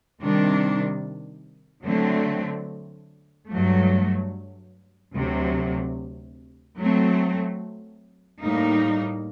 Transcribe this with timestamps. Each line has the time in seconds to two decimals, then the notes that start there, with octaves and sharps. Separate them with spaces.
0.21 C3 D#3 G3 D4
1.85 D3 F#3 A3 C4
3.50 G2 F#3 A3
5.14 D2 C3 F#3
6.78 F#3 A3 C4
8.42 A2 G3 A#3 D#4